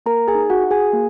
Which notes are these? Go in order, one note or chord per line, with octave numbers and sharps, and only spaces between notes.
A#3 A#4 A#5
G#4 G#5
D#4
F#4 F#5
F#4
G#4 G#5
A#3